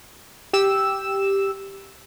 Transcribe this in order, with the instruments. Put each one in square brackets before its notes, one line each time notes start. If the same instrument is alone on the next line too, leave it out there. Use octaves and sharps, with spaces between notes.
[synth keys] G4 E6 E7